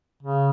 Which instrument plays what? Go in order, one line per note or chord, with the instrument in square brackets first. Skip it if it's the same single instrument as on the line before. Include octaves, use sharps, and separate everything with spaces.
[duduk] C#3